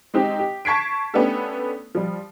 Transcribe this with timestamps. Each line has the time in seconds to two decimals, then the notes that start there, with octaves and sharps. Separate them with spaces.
0.14 G#3 C4 D#4 G4
0.39 G4
0.65 A5 C#6 G#6 B6 C7 D7
1.14 A3 B3 C#4 D4 G4 A4
1.95 F3 G3